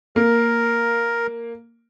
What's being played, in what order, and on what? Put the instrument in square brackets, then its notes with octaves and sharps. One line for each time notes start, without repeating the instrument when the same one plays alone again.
[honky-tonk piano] A#3 [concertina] A#4